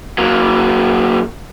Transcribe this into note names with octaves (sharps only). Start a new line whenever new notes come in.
F#3 A#3